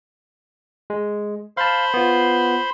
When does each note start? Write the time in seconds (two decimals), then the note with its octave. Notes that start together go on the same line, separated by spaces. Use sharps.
0.90 G#3
1.57 C5 F5 A5 B5 C6
1.94 B3 F4